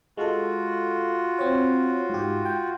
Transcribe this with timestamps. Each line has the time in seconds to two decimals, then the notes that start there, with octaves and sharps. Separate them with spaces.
0.17 G#3 F4 F#4 A4
1.39 C4 C#5
2.10 G#2 G4
2.45 G5